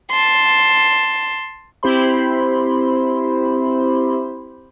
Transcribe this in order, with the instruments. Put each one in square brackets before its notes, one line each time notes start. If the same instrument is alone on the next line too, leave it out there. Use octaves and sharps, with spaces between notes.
[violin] A5 C6
[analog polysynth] C4 E4 G4 C5 B5 C6